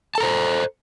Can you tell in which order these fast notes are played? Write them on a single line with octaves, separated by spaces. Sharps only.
A5 A4 A#5 C5